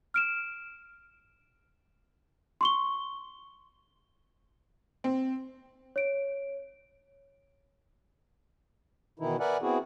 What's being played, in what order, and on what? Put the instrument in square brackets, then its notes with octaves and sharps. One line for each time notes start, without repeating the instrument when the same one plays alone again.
[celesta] F6 D7 E7
C6 C#6 G7
[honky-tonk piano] C4
[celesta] C#5 D7
[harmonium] B2 D#3 E3 D#4 E4
A#4 B4 D5 E5 F#5 G#5
B3 C4 E4 F#4 G#4